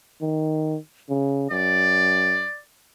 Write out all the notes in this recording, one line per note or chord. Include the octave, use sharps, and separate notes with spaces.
D#3
C#3
F#2 D5